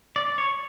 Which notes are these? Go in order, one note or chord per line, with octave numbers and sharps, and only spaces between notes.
D5
C#5